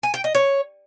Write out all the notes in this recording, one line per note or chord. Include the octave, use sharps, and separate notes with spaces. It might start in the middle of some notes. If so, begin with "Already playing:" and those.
G#5
G5
D#5
C#5